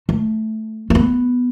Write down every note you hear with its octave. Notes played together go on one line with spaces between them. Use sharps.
A3
A3
B3